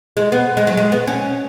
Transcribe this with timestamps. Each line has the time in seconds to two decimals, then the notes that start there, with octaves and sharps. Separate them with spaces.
0.17 G#3
0.32 B3
0.57 G#3
0.67 F#3
0.77 G#3
0.92 B3
1.07 C#4